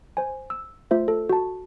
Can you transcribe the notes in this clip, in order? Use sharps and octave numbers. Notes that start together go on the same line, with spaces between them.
C5 G#5
E6
A3 F4 C5 E5
A4
F#4 A5